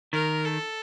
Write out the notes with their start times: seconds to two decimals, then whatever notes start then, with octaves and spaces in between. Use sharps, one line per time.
0.13 D#3 A#4
0.45 A4